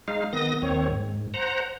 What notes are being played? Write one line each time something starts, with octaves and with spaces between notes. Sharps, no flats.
G#3 D#4 F5
D#3 B3 D#6 A#6
D#2 D#3 C4 C#5
G#2
C5 F#5 A#5